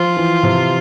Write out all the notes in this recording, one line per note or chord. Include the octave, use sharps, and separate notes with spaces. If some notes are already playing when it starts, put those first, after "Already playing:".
Already playing: F3 F4
E3
C3